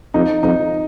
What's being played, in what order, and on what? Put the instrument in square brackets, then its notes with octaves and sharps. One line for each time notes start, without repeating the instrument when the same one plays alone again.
[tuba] F2 [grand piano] D#4
[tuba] F2 [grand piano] D#4